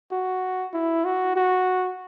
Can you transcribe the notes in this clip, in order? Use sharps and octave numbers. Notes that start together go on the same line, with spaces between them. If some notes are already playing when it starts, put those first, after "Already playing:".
F#4
E4
F#4
F#4